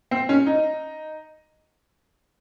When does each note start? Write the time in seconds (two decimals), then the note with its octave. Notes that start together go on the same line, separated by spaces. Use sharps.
0.11 C4
0.29 C#4
0.46 D#4